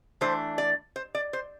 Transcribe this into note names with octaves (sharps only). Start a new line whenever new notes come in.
E3 A3 D4 C5
D5
C5
D5
C5